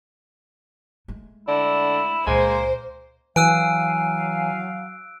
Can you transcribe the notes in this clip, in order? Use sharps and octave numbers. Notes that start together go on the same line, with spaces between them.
G#3 A3
D3 E4
C#2 A#2 G#3 A#3 C5
E3 F#3 F5 G#5 E6 F#6 D7